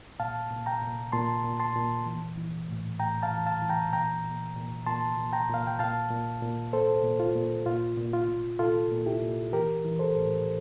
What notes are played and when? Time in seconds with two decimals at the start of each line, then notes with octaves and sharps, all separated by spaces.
0.20 A#2 F5 A5
0.51 A#2
0.66 G5 A#5
0.82 A#2
1.12 A#2 A5 C6
1.44 A#2
1.60 A5 C6
1.76 A#2
2.06 E3
2.38 E3
2.68 A2
2.99 A2 G5 A#5
3.23 F5 A5
3.30 E3
3.46 F5 A5
3.62 E3
3.69 G5 A#5
3.93 A#2 G5 A#5
4.24 A#2
4.56 A#2
4.87 A#2 A5 C6
5.18 A#2
5.33 G5 A#5
5.49 A#2 F5
5.67 G5
5.79 A#2 F5 A5
6.11 A#2
6.42 A#2
6.73 A#2 A4 C5
7.04 A#2
7.20 F4
7.35 A#2
7.66 A#2 F4
7.97 A#2
8.13 F4
8.28 A#2
8.59 A#2 F4 A4
8.91 A#2
9.06 E4 G4
9.23 A#2
9.53 E3 G4 A#4
9.84 E3
9.99 A4 C5
10.16 A2